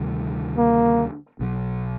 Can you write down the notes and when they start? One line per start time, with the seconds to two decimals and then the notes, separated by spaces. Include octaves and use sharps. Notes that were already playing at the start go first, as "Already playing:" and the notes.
Already playing: D2 C3 D#3 G3
0.57 A#3
1.40 B1 B2 F#3